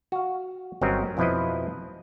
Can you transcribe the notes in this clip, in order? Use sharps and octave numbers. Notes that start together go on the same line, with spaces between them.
F#4 F5
G1 F#3 C4 C#4 A#4 D#5
F2 B2 F3 E4 B4 D#5